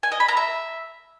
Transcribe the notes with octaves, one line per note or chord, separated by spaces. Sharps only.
G#5
D#5
B5
A#5
E5